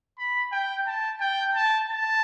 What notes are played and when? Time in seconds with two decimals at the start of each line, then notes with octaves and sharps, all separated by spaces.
0.18 B5
0.52 G5
0.87 A5
1.21 G5
1.55 A5
1.90 A5